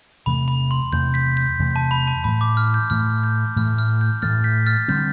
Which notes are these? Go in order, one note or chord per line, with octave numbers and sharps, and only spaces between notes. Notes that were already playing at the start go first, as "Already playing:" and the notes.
E2 C3 E3 A3 B5
B5
C6
E2 C3 E3 A3 G6
G6 B6
G6
E2 C3 E3 A3
A5
B5
A5
A2 E3 A3 B5
D6
F6
G6
A2 E3 A3 F6
G6
A2 E3 A3 F6
F6
G6
A2 E3 A3 F6 A6
G6 B6
F6 A6
D3 G3 C4 G6